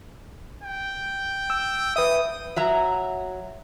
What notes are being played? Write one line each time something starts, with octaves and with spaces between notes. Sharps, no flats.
G5
E6
B4 E5 D#6
F#3 E5 A#5